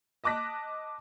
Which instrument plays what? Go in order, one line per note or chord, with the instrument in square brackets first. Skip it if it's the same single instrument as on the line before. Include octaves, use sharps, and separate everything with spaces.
[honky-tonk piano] D#5 A5 D6 F#6 A#6 B6